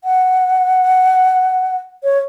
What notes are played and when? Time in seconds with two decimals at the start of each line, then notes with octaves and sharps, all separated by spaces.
0.04 F#5
2.04 C#5